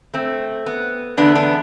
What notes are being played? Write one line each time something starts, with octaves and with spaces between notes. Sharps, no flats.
A3 C4
B3
E2 D3 A3 B3 D4
B3 D4